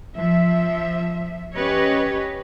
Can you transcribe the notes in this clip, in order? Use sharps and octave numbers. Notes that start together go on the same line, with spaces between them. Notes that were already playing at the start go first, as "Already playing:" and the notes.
F3 E5
C#4 G4 B4 C#5 D#5